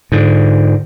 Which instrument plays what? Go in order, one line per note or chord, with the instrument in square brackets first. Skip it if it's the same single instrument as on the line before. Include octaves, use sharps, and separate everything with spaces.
[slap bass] G#2 D3